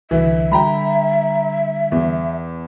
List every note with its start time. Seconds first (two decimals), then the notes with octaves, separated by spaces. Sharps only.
0.11 C2 D3 E3 E5
0.52 D3 G3 G5 A#5 B5
1.92 E2